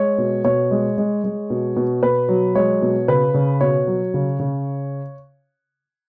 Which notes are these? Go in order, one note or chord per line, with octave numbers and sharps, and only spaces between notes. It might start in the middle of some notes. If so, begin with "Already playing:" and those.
Already playing: G#3 C#5
B2
B2 C#5
G#3
G#3
G#3
B2
B2
B2 B4
F#3
G#3 C#5
B2
C#3 B4
C#3
B2 C#5
F#3
C#3
C#3